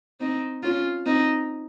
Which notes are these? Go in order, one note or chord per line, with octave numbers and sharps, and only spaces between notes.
C4 D#4
C#4 F4
C4 D#4